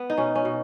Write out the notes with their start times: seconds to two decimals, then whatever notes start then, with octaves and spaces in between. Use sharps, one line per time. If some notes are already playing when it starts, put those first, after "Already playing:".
Already playing: B3
0.10 D#4
0.17 B2 C#4
0.35 C#4
0.45 B2